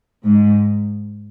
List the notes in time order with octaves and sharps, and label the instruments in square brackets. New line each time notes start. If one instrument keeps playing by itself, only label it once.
[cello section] G#2